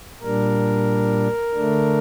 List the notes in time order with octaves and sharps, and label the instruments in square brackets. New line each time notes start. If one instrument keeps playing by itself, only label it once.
[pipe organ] A#2 G3 D4 A#4
D3 A3 D4